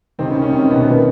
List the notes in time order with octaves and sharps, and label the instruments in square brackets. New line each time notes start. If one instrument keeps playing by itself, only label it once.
[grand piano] C3 C4 [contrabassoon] D#3
[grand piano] C#3 C#4
C#3 C#4
C3 C4
B2 B3
A#2 A#3